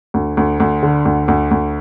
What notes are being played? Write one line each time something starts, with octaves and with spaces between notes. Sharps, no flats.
D2
D2
D2
D3
D2
D2
D2